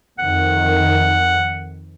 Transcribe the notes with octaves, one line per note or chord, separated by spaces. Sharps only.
F2 D#3 F#5